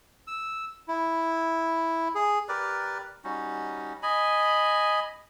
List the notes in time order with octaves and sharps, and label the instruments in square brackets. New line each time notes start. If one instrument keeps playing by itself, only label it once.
[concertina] E6
E4
G#4
[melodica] G4 A#4 B4 D5
G3 C#4 D#4 F#4
D#5 G#5 B5